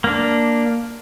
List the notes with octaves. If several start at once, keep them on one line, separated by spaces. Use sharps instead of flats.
A#3 D4